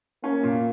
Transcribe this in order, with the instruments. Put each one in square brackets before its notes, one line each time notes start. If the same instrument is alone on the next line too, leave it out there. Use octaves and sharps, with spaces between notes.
[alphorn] A#3 [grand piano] C#4
[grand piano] A#2